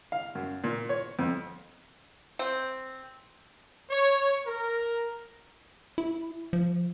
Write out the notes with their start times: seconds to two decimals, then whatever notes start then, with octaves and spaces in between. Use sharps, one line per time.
0.12 F5
0.35 F#2
0.64 A#2
0.89 C#5
1.19 F2
2.39 C4
3.90 C#5
4.45 A#4
5.98 E4
6.53 F3